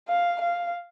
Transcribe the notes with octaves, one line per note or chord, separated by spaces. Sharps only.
F5
F5